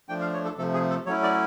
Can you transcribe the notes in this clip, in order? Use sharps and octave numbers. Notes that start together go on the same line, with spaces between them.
F3 A3 D4 G5
F5
C#5
A4
C3 F3 A3 A4
G#4
A4
F#3 A3 C#4 E4 C#5
D5